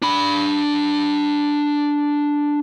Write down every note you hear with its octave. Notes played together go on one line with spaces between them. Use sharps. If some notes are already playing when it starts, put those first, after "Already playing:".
D4 B5